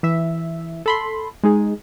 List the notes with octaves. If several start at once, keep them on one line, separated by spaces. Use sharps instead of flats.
E3 E5
A4 B5 C6
G#3 D#4 G#4